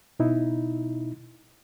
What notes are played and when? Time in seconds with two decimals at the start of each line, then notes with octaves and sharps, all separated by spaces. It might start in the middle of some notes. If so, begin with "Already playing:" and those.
0.20 B2 D#4 E4